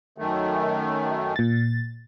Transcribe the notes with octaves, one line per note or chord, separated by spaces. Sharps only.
F#2 D#3 A3
A#2 A6